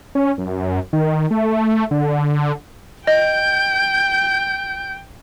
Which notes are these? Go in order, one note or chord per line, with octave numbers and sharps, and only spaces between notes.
C#4
F#2
D#3
A3
D3
D#5 G5 G6